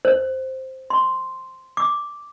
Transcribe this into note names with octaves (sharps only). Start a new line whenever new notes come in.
C5
C6
D6